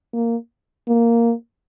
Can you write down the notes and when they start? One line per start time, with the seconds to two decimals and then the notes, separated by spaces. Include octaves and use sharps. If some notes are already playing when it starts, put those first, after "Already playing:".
0.13 A#3
0.88 A#3